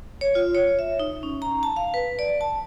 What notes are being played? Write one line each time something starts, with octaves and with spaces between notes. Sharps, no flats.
C#5
F4
C#5
E5
D#4
C#4
A#5
A5
F5
B4
D5
A5